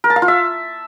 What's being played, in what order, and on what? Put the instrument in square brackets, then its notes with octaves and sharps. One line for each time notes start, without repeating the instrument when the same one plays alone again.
[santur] A#4
A5
F5
F4
E5